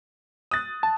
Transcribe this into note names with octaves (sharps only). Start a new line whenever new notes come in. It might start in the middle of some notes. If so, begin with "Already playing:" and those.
D#6 F#6 A6
A5